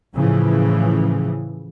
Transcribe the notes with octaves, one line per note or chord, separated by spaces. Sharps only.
A2 C#3 E3 F3